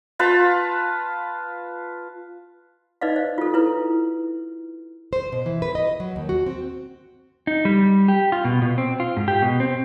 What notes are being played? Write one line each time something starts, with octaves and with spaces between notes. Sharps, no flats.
F4 B4 A5 C6
D#4 B4 D5 D#5 F5
C5
F4 A4
E4 A4 B4
C5
B2
E3
B4
D#5
F#3
D#2
F#4
C4
D#4
G3
G4
F4
B2
B2
C4
F4
G#2
G4
B2
C4